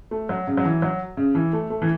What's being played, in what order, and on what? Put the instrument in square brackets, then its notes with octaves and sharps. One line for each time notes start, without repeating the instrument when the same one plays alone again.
[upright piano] A3
F#3
C#3
F#3
E3
F#3
C#3
E3
A3
A3
E3